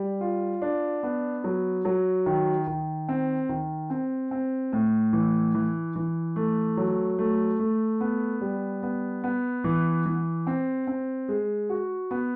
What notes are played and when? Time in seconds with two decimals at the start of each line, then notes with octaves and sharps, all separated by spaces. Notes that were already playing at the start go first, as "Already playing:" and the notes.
Already playing: G3
0.21 F4
0.62 D4
1.03 B3
1.44 F#3
1.85 F#3
2.26 D#3
2.67 D#3
3.09 C4
3.49 D#3
3.90 C4
4.31 C4
4.72 A2
5.13 E3
5.54 E3
5.96 E3
6.36 A3
6.77 F#3
7.19 A3
7.59 A3
8.01 B3
8.41 G3
8.83 B3
9.24 B3
9.64 E3
10.06 E3
10.47 C4
10.87 C4
11.29 G#3
11.70 F#4
12.11 B3